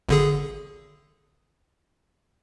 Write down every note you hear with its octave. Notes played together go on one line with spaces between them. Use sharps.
G#1 D3 G#4